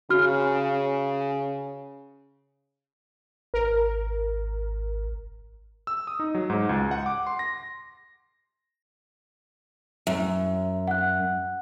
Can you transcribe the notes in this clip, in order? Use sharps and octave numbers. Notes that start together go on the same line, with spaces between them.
C#3 F#4 F6
G#1 A#4
E6
D#6
D#4
F#3
G#2
C#2
F#5
D6
C6
A#6
F#2 E5
F#5 F#6